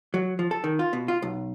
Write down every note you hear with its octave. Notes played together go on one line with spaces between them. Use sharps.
F#3
F3
A4
D#3
F4
B2
F4
B1